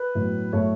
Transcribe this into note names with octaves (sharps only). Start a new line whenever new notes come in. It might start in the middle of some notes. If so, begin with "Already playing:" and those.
Already playing: B4
A2 F#3 B3
A2 F#3 A3 C#5